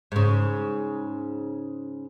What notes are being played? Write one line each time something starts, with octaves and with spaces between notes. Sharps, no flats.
G#2 C#3